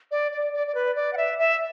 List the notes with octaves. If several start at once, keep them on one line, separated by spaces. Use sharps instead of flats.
D5
D5
D5
D5
B4
D5
F#5
E5
E5